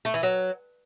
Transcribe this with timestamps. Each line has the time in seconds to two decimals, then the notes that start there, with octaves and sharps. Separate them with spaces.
0.05 A3
0.14 E3
0.23 F#3